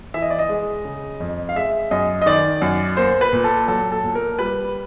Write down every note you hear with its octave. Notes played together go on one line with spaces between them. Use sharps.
E3 E5
D#5
D5
D#5
G#3
C#3
F2
F5
G#3 E5
F#2 D#5
D#5
D#3 D5
F#2
A#3 C5
B4
A#2
A4
F#3 A4
A4
A#2
A#4
G3 B4